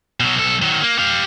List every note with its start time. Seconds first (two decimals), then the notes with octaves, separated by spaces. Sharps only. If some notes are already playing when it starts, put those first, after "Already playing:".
0.20 B2 F#3
0.36 B1 A4
0.62 D#3 F#3
0.82 A#3
0.99 G4 F5